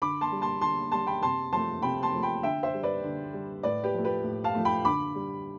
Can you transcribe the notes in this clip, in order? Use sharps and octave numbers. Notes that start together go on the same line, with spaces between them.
D3 B5 D6
A5 C6
G3
A5 C6
D3 A5 C6
G3 A5 C6
G5 B5
C3 A5 C6
F3 A3 A5 C6
C3 G5 B5
A5 C6
F3 A3
G5 B5
D3 E5 G5
C5 E5
G3
B4 D5
D3
G3
A2 B4 D5
G4 B4
F3 A3
G4 B4
A2
F5 A5
F3 A3
G5 B5
D3 B5 D6
G3